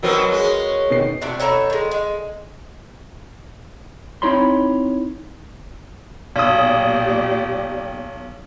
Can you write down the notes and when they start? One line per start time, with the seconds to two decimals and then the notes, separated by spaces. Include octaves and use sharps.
0.03 B2 F#3 C4 F#4 A#4 B4
0.32 G#3 C#4
0.90 B2 D#3 C7
1.22 C3 D4 F#4 G5
1.40 B2 D#4 A4 C#5
1.70 D#3 G#3
1.91 G#3
4.22 C4 D#4 E4 C#5 B5 C6
6.36 B1 A#2 G4 D5 D#6